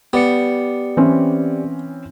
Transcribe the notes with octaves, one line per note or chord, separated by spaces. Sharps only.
B3 G4 D5 C#7
E3 C4 C#4